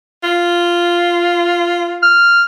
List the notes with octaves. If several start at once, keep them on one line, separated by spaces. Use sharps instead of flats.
F4
F6